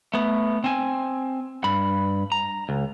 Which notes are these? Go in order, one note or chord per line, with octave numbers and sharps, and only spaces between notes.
A3 B3
C4 G#5
G2 B5
A#5
C#2